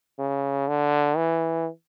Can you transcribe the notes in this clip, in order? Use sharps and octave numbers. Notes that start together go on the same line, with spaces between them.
C#3
D3
E3